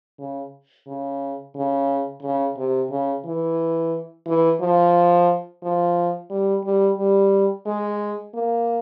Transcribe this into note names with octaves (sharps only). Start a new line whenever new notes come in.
C#3
C#3
C#3
C#3
C3
C#3
E3
E3
F3
F3
G3
G3
G3
G#3
A#3